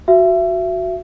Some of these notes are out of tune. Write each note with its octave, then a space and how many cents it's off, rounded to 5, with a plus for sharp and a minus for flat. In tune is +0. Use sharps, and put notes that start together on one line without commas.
F#4 +0 E5 +30